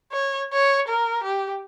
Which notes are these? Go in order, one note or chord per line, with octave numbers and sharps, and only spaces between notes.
C#5
C#5
A#4
G4